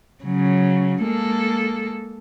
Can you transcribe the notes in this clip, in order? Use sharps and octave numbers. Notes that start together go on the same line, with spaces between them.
C#3 F#3
G#3 A#3 A4